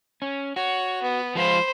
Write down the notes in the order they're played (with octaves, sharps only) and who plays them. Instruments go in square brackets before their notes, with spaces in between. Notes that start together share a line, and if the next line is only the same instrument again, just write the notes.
[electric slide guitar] C#4
[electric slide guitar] F#4 [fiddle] C#5
[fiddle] B3
[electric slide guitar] F3 G#3 F4 [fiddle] C5 B5